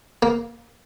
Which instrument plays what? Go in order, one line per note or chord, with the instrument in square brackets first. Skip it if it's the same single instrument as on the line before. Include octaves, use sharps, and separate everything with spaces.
[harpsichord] A#3